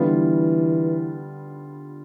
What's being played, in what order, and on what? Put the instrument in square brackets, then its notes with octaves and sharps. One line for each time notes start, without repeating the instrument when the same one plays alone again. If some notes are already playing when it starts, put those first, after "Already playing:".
Already playing: [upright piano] D3 G3 B3 F4 B4 [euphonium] E3